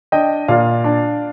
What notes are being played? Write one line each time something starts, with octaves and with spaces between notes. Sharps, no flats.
D4 D#5 G5
A#2 D5 F5
D4